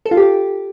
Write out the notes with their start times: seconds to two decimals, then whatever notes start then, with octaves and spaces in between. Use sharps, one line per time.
0.06 A4
0.11 F4
0.17 G4